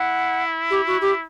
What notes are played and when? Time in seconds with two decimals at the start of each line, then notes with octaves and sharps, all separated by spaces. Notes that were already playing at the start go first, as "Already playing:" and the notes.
Already playing: E4 F#5
0.70 G4
0.86 F#4
1.01 G4